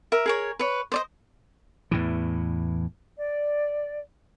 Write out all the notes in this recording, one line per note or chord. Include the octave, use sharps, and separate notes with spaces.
A#4 E5
G#4 A#4 C#5
B4 C#5
C5 D5 D#5
E2 A2 E3
D5